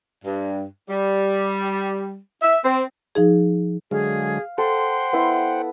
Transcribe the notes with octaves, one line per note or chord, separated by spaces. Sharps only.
G2
G3
E5
C4
F3 D#4 G#4
D3 F#3 G#3 G#4 F5
A4 C5 F#5 G5 C6
B3 E4 B4